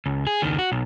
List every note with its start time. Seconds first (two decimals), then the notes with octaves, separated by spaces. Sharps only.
0.06 C#2
0.27 G#4
0.42 C#2 D#3
0.59 F#4
0.72 B1